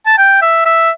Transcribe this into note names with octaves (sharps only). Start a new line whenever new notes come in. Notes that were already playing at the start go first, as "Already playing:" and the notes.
A5
G5
E5
E5